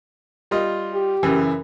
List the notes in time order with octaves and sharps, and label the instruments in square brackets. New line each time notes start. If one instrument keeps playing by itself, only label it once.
[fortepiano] G3 F4 D#5
[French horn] G4
[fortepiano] F#2 C#3 E3